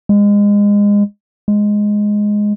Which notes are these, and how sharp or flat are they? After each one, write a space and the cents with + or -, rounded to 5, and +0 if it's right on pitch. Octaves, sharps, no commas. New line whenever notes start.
G#3 -25
G#3 +0